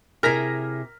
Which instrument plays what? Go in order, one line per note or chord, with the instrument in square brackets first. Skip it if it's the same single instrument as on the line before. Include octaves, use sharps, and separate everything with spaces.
[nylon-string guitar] C3 E4 G#4 [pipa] A#4 [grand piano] F6 A#6 B6